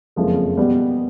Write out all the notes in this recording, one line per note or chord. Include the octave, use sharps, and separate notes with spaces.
F#1 F2 C#3 F3 G#3
B2 G3 B3